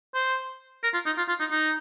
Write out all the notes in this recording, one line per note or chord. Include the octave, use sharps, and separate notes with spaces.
C5
A#4
F4
D#4
F4
F4
D#4
D#4